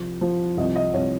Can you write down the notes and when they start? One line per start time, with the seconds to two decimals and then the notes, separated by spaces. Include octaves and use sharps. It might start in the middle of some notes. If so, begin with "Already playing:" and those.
Already playing: C2 F3
0.21 F3
0.57 C2 D#5
0.76 D#5
0.93 C2 C#5